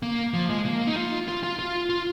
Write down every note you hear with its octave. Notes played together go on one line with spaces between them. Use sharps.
A#3
F3
G#3
A#3
D#4
F4
F4
F4
F4
F4